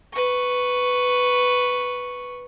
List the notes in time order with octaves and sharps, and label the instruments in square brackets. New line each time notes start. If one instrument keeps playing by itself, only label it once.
[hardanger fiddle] B4 C#6